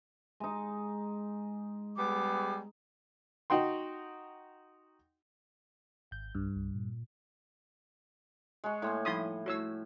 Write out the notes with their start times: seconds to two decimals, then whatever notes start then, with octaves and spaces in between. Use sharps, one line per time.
0.40 G#3 D#4
1.97 G3 B3 G#4 D6
3.50 D#4 F#4 G5 C6
6.11 G#1 G6
6.35 B1 G2
6.55 C2
6.75 A#2
8.64 G#3 C#6
8.82 A2 A#3 C6 G#6
9.05 F3 G3 D#4 E4 C6 D#6
9.46 A3 E4 F#4 C#5 E6